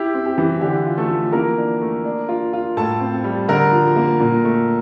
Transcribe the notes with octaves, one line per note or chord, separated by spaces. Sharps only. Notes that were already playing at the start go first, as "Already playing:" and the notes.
Already playing: E4 G4
C4
G4
E3
D3 G4
F4
A3 A4
F3
E3 A#3 A#4
D4
A3
D4
F4
F4
A2 A4 A5
C4
G3
D3 A#4 A#5
F3
A#3
A#2
A3